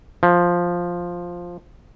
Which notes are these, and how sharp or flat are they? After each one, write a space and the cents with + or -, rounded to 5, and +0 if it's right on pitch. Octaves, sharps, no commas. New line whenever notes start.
F3 +5